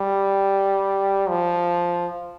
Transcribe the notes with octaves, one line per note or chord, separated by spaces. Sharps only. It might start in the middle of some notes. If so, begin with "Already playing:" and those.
Already playing: G3
F3